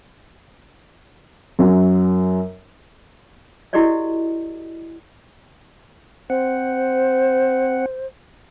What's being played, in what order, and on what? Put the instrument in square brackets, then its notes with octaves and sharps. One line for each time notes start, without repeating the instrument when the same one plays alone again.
[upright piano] F#2 F#3
[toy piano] E4 F#4 G4 A4 D5 D#5
[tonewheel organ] C4 F#5 [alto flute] C5